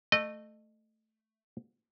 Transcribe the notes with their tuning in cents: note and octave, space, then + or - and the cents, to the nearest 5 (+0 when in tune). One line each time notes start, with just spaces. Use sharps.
A3 +0 D#5 -25